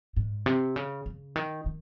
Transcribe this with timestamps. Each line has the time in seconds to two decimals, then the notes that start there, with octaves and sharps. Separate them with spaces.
0.16 G#2
0.46 C3
0.76 C#3
1.06 C#3
1.36 D#3
1.66 D#3